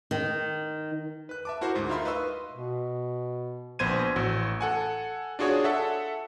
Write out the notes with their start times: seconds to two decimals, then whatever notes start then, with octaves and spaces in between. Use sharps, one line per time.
0.11 D#3
1.29 B4 F#6
1.45 E5 A5 D6
1.61 E4 F#4 A#4 C5
1.75 D2 G#2
1.89 D#4 F4 A#4 E5 B5 C6
2.05 B4 D#5 F5 C6 C#6 E6
2.51 B2
3.79 A#1 B3 C5 G#6 D#7
4.16 A1 F#4 E6
4.61 A4 F#5 G#5
5.39 D4 F4 F#4 G#4 C#5
5.64 A4 E5 F#5